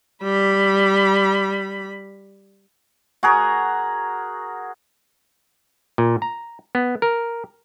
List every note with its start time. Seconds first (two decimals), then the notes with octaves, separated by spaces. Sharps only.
0.23 G3 B5
3.23 F#4 G#4 A#4
5.98 A#2
6.22 A#5
6.75 B3
7.02 A#4